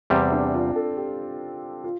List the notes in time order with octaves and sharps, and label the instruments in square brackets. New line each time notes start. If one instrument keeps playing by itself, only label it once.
[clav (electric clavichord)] E2 C3 G3 [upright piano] C4
[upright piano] D4
F4
A4
G4
F4